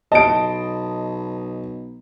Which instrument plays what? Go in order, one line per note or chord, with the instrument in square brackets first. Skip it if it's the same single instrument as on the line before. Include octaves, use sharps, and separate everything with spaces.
[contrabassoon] B1 [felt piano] D#5 [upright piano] A5 D7